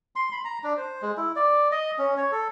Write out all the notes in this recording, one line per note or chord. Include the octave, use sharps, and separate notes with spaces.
C6
B5
A#5
D4
C5
G#3
E4
D5
D#5
C#4
C#5
A4